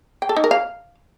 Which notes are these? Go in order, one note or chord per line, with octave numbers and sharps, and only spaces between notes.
G5
A4
D#4
A#4
F5